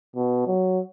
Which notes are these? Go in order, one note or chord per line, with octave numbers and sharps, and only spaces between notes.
B2
F#3